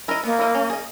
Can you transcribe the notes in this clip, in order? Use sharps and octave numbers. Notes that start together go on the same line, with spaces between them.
E4 A#4 D#5
A#3 B3
E4 A#4 D#5
C#4
G#4 D#5